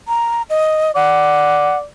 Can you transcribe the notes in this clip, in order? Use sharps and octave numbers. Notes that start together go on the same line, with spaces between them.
A#5
D#5
D5 F#5